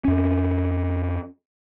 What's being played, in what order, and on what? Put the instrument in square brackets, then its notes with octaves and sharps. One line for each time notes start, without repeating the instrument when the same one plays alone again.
[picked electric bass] F2 C#4